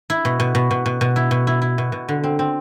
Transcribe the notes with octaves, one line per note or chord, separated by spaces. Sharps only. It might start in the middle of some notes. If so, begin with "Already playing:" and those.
E4
B2
B2
B2
B2
B2
B2
E4
B2
E4
E4
B2
B2
D3
C4
C4